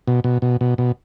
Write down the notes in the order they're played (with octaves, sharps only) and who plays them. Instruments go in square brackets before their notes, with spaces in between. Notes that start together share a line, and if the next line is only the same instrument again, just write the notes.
[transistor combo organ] B2
B2
B2
B2
B2